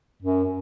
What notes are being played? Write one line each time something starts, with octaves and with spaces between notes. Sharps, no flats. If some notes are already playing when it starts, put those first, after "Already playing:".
F#2